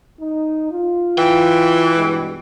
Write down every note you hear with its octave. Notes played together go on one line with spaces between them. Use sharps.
D#4
F4
E3 G5
G2 B2 G#3